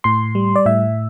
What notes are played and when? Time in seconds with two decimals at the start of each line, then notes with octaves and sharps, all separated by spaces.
0.04 A2 C6
0.35 G3
0.56 D5
0.66 A2 E5